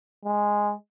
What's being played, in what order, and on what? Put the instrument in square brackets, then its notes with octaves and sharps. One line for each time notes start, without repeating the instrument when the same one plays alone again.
[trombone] G#3